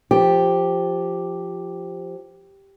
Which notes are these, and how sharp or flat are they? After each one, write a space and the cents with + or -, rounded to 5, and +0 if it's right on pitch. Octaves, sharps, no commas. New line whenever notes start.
F3 +0 G4 +0